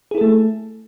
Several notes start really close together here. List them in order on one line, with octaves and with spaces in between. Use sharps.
G#4 E4 A4 A3